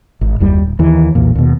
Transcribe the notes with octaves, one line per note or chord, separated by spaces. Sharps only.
G#1
F#1 D#2 G3
D1
D#2 E3
B1 E2 A#2
D#2 B2